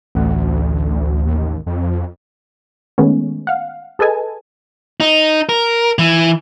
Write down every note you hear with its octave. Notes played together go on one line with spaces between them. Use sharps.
A1 D2 F#5
D#2
F2
D#3 G#3 A3 B3 C#4
F5 F#5
G#4 A4 B4 D#5 G#5 A5
D#4
A#4
E3